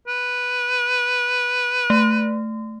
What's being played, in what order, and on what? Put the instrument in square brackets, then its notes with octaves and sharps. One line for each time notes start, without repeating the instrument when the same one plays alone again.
[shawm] B4
[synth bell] A3